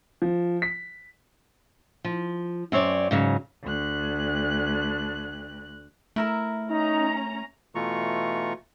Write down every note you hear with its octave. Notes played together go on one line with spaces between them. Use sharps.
F3
B6
F3
F#2 C4 C#5 D5
G#2 C#3 F#3
D2 F#6
A3 E4 A#4 E5
C#4 D#4 A#5
B2 E3 A3 F4 A#5 C#6